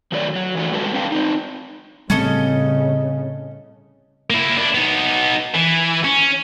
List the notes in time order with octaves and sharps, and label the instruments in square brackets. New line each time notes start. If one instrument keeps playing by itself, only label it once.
[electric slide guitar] D#3 F#3 A3 B4 C#5 D5
F#3
E3 A3 D4 F#4
G3 G#3 A4 B4 A5
C4 D4 B4 F5 G5 A5
C4 D#4
[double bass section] A2 C#3 [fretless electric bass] G3 C4 [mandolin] C#4 A4 D#5
[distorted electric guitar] A#3 E4
D4 E4
B3 D#4
E3
C#4